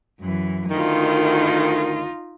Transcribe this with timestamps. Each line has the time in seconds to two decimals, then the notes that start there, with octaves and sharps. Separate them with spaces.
0.20 F#2 E3
0.71 D2 D#3 D#4 F4